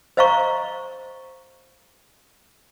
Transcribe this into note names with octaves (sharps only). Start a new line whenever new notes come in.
C5 D#5 F5 A#5 C#6